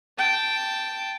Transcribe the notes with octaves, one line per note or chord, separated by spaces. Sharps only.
G5 A5